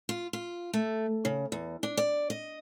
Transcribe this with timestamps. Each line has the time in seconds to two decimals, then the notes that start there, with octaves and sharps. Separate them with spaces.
0.09 F4
0.33 F4
0.74 A3
1.25 C#3
1.52 E2
1.83 D4
1.97 D5
2.30 D#5